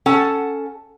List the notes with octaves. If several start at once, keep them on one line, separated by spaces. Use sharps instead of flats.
C#4 A4 F#5 A5